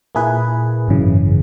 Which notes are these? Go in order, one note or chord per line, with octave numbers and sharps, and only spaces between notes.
A#2 A#3 E4 G#4 B4
G#1 F#2 C#3 E3